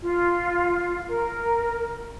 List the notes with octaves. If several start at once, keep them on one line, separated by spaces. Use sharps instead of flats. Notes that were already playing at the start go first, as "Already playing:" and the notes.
F4
A#4